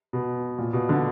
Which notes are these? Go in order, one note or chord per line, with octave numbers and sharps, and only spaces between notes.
B2
A#2
B2
D3